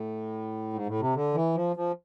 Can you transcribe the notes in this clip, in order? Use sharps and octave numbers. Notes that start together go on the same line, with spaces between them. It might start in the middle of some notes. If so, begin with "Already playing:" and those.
Already playing: A2
G#2
A2
C3
D3
E3
F3
F3